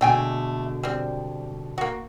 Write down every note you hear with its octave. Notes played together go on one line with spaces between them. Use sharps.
B2 D3 G#3 A3 G5 G#5
G3 C4
A#3 F#4